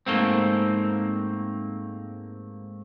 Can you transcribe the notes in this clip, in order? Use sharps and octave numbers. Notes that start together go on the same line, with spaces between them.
G#2 A3 A#3 C4